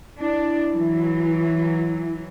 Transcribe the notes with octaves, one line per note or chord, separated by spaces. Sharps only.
D4 E4
E3 F#3